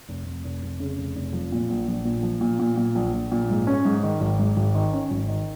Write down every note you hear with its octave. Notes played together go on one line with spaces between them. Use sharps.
F1
F1
F1
F1
C#3
F1
F1
F3
A#2
A#1
A#1
A#2
F3
A#2
A#2
A#2
A#1
A#1
A#2
G#2
C#4
G#2
D#3
G#1
G#2
G#1
D#3
C#4
G#1
D#3